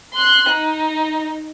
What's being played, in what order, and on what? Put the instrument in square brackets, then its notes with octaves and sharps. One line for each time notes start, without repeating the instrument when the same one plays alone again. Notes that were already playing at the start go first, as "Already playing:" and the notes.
[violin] C6 F#6
D#4